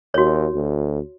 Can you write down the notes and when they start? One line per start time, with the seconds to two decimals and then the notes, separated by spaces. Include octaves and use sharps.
0.14 D#2 F#4 C#5
0.54 D2